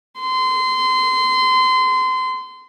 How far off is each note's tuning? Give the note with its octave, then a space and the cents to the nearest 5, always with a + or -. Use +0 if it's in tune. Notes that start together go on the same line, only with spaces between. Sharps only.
C6 -25